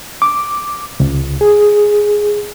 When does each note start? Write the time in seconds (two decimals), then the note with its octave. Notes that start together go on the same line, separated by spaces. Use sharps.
0.22 D6
1.00 C#2
1.41 G#4